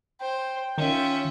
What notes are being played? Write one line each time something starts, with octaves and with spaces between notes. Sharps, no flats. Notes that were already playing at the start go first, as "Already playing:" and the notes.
C5 G5
D#3 C#4 F4 E5